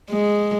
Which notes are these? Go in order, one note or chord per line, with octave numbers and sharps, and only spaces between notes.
G#3